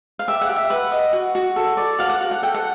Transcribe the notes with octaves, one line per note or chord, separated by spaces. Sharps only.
F5
G4 E5
F#5
G4
E5
B4 F#5
D#5
F#4
F#4
A4
D5
F#4 F5
F#5
F#4
F#5
A4 G5
F#5